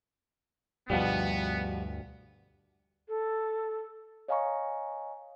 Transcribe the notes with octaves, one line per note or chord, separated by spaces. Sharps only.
D2 G2 B2 F3 G3 B3
A4
C#5 D#5 F5 G#5 A#5 C#6